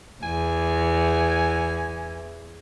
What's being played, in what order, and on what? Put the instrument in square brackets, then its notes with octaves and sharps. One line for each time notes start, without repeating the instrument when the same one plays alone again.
[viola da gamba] E2 [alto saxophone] G#5